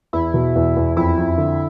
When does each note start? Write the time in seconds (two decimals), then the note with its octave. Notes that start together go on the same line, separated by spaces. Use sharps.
0.13 E2 E4
0.34 B2
0.55 E2
0.76 E2
0.96 F2 E4
1.17 F2
1.38 D3